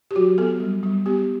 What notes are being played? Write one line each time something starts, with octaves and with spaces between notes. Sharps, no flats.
G4
F#3 F#4
B3 A4
G3
G3
B3 G4